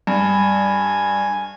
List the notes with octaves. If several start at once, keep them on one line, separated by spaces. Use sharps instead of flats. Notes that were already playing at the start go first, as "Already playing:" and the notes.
G2 G#5